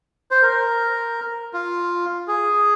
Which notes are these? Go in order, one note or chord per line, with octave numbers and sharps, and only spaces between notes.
C5
A#4
F4
G#4